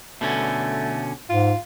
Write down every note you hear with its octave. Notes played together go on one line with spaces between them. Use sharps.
B2 D3 A3 C#4
G#2 F4